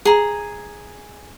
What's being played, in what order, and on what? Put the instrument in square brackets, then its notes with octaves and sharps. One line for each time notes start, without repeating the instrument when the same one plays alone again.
[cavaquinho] G#4 A#5